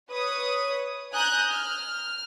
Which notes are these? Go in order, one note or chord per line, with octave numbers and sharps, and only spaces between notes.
B4 C#5 D#6
G#5 A#5 D#6 F#6 G6
F6